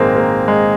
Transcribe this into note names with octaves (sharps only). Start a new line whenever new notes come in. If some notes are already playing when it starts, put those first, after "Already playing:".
Already playing: A#1 G#2 D#3 G#3 A#3 C4
A#3
G#3